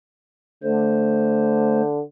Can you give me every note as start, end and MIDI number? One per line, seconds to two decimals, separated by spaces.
0.63 2.01 50
0.63 1.82 57
0.63 1.82 72